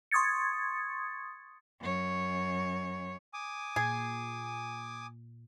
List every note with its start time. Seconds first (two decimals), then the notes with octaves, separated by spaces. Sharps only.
0.11 C6 C#6 D#6 G#6 A6 C#7
1.81 F#2 C#5
3.34 G#5 D6 D#6
3.76 A#2 G#4